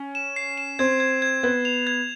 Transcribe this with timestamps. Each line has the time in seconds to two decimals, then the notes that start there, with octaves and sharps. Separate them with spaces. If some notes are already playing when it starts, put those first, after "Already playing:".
Already playing: C#4
0.15 E7
0.36 C7
0.58 E7
0.79 C4 G#6
1.00 G#6
1.22 G#6
1.43 B3 G#6
1.65 F7
1.87 G#6